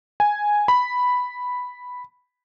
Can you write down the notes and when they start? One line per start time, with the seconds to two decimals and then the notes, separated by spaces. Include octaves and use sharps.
0.20 G#5
0.68 B5